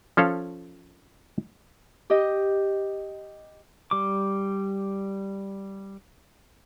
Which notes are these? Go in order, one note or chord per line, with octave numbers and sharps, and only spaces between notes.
F3 C#4 A4 F5
G4 D#5
G3 D6